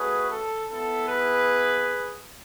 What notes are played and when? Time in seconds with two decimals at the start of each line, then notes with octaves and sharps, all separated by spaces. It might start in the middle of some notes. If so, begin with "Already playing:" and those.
Already playing: A3 C#4 F#4 G#4 B4
0.30 A4
0.69 B3 E4 A4
1.09 G#4 B4